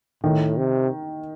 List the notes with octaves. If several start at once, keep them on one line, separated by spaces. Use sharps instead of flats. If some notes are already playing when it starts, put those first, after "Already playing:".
A2 D#3
C3